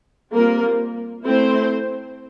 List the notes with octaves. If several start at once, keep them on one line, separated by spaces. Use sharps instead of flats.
G3 A#3 C4 F4 A#4
A3 C4 E4 C5